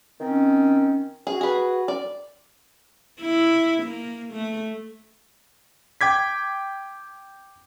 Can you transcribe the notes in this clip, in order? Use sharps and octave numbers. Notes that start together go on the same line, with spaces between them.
D#3 C4 C#4
F#4 G#4
G#4 B4
D5
E4
A#3
A3
G5 D6 G#6 B6